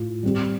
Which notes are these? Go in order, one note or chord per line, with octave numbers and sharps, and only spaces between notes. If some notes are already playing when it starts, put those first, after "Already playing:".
Already playing: A2 F4
G3 C4 G4